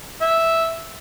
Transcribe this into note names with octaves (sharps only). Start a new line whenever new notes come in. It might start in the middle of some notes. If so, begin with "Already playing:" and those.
E5